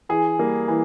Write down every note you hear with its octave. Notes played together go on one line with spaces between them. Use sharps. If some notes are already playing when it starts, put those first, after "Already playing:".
E3 G#4
G3 A#3
E3